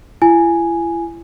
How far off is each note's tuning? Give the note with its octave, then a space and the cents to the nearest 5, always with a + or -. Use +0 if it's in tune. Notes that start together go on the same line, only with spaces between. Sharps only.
E4 +40 G#5 +0